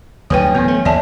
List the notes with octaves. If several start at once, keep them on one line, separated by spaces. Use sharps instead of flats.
D2 G#2 F#3 C#4 B4 G5
A2 E3 B3
A3
D#2 D5 E5 A5